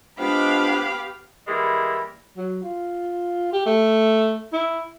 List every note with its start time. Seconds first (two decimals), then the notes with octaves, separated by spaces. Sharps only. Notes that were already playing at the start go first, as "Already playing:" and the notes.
0.19 F3 G#3 B3 D4 G4 F5 B5 D6
1.47 E3 G3 G#3 A#3 E4
2.37 F#3
2.63 F4
3.52 G4
3.66 A3
4.53 E4